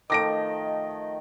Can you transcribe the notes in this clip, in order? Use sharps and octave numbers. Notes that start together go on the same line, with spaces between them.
D#3 F3 A3 D#5 D6 A#6 D7